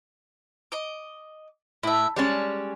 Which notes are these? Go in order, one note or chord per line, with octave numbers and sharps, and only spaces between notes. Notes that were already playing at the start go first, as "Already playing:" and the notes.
D#5 D6
A2 E4 E5
G3 G#3 C#4 D5 A5